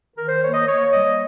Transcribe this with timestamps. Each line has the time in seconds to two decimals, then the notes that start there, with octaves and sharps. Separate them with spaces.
0.16 D#3 A#4
0.28 C5
0.41 A#3 C#5
0.54 D#5
0.66 A#3 C#5
0.92 G3 D#5